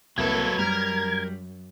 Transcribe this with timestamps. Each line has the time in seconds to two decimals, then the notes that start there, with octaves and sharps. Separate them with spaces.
0.18 C2 F#3 A#3 A4 B4 G#6
0.59 F#2 G3 A#4